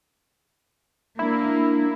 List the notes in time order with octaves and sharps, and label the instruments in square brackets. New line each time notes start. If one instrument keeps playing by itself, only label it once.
[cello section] A#3 [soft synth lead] D4 [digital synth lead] E4